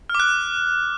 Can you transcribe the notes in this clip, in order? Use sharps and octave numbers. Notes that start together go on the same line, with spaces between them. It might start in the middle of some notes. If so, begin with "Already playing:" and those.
F6
D6
F#6